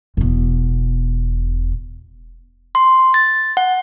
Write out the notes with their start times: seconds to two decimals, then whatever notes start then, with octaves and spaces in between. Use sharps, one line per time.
0.17 E1 B2
2.75 C6
3.14 A6
3.57 F#5